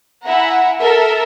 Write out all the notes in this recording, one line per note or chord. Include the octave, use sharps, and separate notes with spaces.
E4 E5 F#5 G#5 A#5
A4 A#4 E5